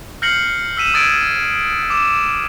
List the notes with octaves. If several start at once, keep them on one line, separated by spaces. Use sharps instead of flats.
F6 G6 A#6 C7 C#7 F#7
E6 B6 D#7 E7
D#6 E6 G#6 A6 C#7 D7
D6 E7